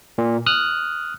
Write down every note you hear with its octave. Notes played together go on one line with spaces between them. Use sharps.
A#2
D#6 F6 F#6